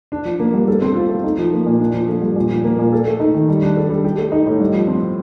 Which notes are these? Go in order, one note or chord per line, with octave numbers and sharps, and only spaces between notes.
D4
F3
A#3
G2
A4
C4
F4
A3
D#4
F3
A#3
A#2
D4
F3
A3
G2
A#2
F3
A#3
A#2
A4
A3
D#4
D#3
G3
D4
A4
G3
G4
A3
D#4
A2
G2
F3
C4